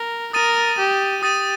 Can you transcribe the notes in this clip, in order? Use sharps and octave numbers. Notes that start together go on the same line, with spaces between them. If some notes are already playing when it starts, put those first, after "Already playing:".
Already playing: A#4
A#4 D#6 A6 D#7
G4
G4 D#6 A6 D#7